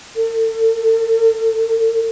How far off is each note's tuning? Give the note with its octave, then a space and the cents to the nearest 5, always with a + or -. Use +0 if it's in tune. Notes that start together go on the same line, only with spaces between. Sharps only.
A4 +35